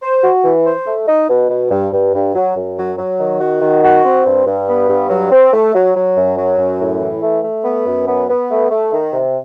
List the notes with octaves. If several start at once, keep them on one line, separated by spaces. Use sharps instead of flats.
C5
F#4
E3
C5
A3
D#4
B2
B2
G2
G2
G2
F#3
F#2
F#3
F#3
D#3
F#4
D#3
F#4
C4
G2
G2
B3
G2
F#3
C4
A3
F#3
F#3
F#2
F#3
F#2
A2
E3
A3
A3
B3
F#2
B3
B3
A3
A3
D#3
C3